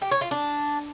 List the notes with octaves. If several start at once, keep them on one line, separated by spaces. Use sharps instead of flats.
G4
C#5
F4
D4